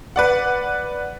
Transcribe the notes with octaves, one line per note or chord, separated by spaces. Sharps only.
B4 D5 F#5